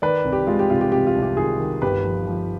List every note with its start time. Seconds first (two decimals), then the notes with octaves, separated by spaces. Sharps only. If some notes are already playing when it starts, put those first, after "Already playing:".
0.02 D#3 B4 D5
0.24 C2
0.32 G4
0.47 G#3 F4
0.59 G4
0.70 C3 F4
0.81 G4
0.92 C3 G4
1.07 F4
1.15 C2
1.22 G4
1.37 D#3 F4 G#4
1.60 D#3
1.82 G1 G4 B4
2.04 F3
2.27 F3